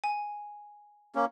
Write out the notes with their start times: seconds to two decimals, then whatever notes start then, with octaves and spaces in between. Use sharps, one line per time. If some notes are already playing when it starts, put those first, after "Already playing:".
0.04 G#5
1.15 A#3 C#4